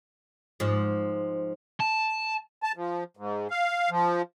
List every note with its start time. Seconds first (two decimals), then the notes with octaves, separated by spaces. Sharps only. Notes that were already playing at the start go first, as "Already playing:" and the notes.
0.60 G#2 F3
1.80 A5
2.63 A5
2.76 F3
3.17 G#2
3.50 F5
3.90 F3